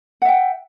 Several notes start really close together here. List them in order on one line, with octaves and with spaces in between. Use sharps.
F#5 E5 G5